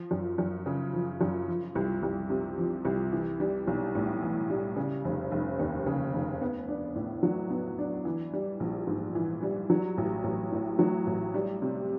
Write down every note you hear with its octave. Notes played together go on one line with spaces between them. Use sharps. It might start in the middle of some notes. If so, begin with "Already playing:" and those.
Already playing: F3
F#2
F#2
C#3
F3
F#2
F3
C2
C2
C3
F3
C2
E3
G3
B1
A2
E3
G3
C#3
F1
F1
D#2
C#3
F1
B3
D4
A2
F#3
B3
D4
E3
G3
A#1
G#2
E3
G3
F#3
A1
A1
A2
F#3
A1
G3
C3